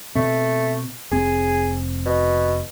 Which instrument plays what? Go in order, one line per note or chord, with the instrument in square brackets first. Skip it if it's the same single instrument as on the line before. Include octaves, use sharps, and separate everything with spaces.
[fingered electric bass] B2 C4 [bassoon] A3
[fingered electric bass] F1 C4 [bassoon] G#4
[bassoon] B2